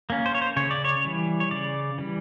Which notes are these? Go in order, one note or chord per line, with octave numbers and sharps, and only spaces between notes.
A#3 C#4
C5
C#5
C5
C#3 C#5
D5
C#5
E3 G3
C#5
C#3 D5
E3 G3